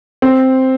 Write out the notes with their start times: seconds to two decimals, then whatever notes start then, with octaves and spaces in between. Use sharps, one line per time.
0.22 C4